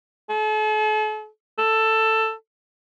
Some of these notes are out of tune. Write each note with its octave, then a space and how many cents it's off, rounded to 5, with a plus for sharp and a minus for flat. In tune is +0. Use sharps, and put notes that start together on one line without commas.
A4 -45
A4 +10